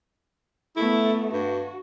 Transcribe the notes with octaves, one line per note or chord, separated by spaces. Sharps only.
A3 B3 E4
G2 F#4